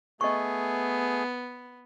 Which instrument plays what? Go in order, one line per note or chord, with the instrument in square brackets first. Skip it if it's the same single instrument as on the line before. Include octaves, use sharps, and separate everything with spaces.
[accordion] A3 G#4 [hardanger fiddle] B3 [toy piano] D#5 C#6